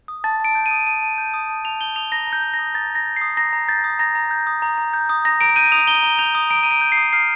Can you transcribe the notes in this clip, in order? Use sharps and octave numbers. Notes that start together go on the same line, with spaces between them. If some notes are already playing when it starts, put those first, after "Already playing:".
D#6
A5 A6
A5 D7
G6
D#7
D#6
A5 D#7
A5
G6
D#6
A5
A5 F7
G6 G7
D#6 F7
A#5 A#6
A#5
G6
G6
A#6
D#6
A#5 A6
A#5
A#6
G6
C7
D#6
A#5 A#6
A#5
G6 A6
D#6
A#5 A#6
A#5
G6
D#6
A#5
A#5
G6
D#6
A#5 A#6
A#5 D7
G6 D#7
D#6 F7
A#5 G7
A#5
G6 F7
D#6
A#5 D7
A#5 D#7
D7
G6
C7
D#6
F6 C7